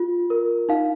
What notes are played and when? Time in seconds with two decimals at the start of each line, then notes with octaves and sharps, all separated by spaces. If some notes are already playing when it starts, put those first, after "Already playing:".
Already playing: F4
0.30 A#4
0.69 D#4 F5